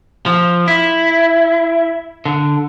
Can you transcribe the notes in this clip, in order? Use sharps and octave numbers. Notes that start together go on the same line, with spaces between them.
F3
E4
D3